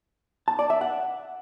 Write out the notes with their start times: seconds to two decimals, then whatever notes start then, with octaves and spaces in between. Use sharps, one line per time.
0.48 A5
0.59 D5
0.70 E5
0.81 F#5